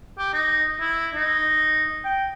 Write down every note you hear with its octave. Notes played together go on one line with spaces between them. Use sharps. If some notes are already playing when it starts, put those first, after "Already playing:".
G4
D#4
E4
D#4
G5